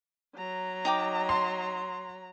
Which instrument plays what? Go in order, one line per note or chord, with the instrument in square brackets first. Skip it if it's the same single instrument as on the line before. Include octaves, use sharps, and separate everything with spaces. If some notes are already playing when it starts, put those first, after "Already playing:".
[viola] F#3 A#5
[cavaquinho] D#4 G5 D6
[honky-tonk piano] C6